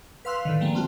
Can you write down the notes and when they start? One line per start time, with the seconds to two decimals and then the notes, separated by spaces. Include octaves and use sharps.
0.25 B4 F5 C6 E6 F#6
0.45 A2 D3 D#3
0.60 D3 F3 G3 G#3 A#3
0.73 G3 A3 C4 F4 F#4